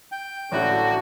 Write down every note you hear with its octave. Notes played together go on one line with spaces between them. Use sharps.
G5
A1 D3 E4 F#4 F#6